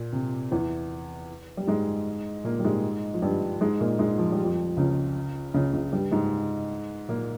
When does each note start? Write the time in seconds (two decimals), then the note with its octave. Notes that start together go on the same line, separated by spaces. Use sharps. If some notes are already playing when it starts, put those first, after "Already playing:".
Already playing: A#2
0.13 C3
0.51 E2 E3
1.57 G3
1.67 G#2 G#3
2.44 A#2 A#3
2.59 G3
2.64 G#2 G#3
3.14 F3
3.22 G2 G3
3.61 G#2 G#3
3.80 A#2 A#3
3.99 G#2 G#3
4.18 F3
4.32 G3
4.44 F2 F3
4.77 C#2 C#3
5.54 C#2 C#3
5.73 C#2 C#3
5.92 G2 G3
6.11 G#2 G#3
7.08 A#2 A#3